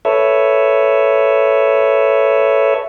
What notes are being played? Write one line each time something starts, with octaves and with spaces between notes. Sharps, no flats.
A4 B4 C#5 E5